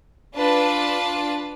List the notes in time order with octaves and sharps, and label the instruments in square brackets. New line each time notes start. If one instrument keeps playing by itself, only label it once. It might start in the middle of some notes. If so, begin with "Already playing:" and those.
[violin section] D4 F4 B4 A5